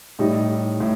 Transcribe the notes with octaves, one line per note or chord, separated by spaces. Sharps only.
A2 G3 D#4
A2